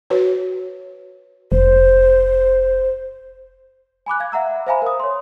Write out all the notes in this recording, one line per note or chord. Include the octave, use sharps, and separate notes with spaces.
F#4 B4 C#5
F1 C5
G#5 B5 D6 F#6
F5 G#6
E5 F#5 A#5 E6
C5 E5 F5 G#5 A#5 B5
A#4 D#6
C#5 C6